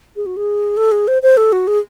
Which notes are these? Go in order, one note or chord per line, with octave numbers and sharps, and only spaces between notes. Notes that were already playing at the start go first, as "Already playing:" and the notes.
G#4
F#4
G#4
A4
G#4
C5
C5
A4
F#4
G#4